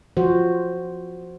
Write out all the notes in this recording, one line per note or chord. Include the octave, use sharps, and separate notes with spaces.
F3 F#4 C5